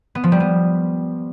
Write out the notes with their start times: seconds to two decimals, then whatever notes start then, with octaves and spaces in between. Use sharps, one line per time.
0.15 B3
0.24 F3
0.32 G3
0.40 B3